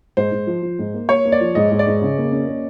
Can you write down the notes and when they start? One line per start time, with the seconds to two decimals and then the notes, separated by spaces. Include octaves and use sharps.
0.17 G#2 C5
0.32 G#2
0.47 F3
0.62 F3
0.79 G#2
0.94 A#3
1.09 A#3 C#5
1.25 A#3
1.32 D5
1.41 F3
1.55 G#2 D#5
1.72 G#2
1.79 D5
1.87 G#2
2.02 C#3
2.18 A#3
2.32 C#4
2.48 A#3